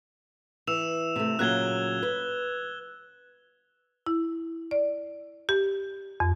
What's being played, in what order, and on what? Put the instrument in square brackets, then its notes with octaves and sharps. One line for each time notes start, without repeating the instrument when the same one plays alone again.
[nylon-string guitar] E3 [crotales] E6 E7 F7
[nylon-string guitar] C3 A3
[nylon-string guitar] A#2 C#3 F#3 [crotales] F#6 G#6 G7
[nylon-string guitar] B4
[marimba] E4
D5
G4
F2